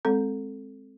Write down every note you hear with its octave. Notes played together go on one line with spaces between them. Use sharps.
G#3 C4 A4